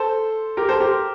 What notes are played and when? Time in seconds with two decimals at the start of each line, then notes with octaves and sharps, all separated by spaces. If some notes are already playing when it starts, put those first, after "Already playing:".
Already playing: A4 C5
0.57 G4 A#4
0.69 A4 C5
0.80 G4 A#4